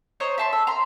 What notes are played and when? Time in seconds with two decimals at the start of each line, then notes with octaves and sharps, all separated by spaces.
0.20 C5 C#5 D#5 A#5
0.38 E5 A5 C6
0.53 E5
0.67 A#5 C6